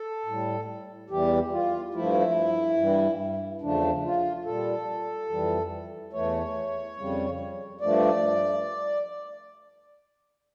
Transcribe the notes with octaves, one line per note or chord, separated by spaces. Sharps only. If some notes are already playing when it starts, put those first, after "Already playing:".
Already playing: A4
A2 G3
E2 E3 G3 G4
F4
G2 F3 A3 E4
G2 E3 G3
E2 C#3 F3 A3 D4
F4
A#2 G3 A4
F2 E3 G3
E2 E3 A3 C#5
F2 C#3 G3
G2 F3 A3 D5